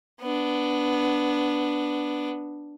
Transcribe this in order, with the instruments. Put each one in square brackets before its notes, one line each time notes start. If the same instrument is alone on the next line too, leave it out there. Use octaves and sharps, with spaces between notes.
[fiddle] B3 D4